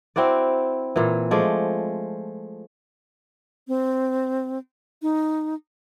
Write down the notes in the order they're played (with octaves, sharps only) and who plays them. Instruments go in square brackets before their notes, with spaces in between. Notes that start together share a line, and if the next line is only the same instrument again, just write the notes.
[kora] C4 E4 F#4 D5
A#2 E3
F3 G#3 A3 D5
[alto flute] C4
D#4